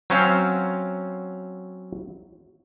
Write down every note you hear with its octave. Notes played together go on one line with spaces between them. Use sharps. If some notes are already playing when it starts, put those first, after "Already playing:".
F#3 C4 C#4 C5 F5